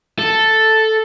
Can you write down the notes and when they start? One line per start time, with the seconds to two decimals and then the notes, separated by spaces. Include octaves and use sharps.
0.19 A4